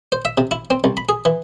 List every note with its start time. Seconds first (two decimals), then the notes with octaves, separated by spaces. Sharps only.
0.12 C5
0.25 E5
0.38 C3
0.51 E4
0.70 C4
0.84 C2
0.97 B5
1.09 G#4
1.25 E3